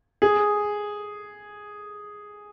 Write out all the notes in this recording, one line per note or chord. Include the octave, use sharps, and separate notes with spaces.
G#4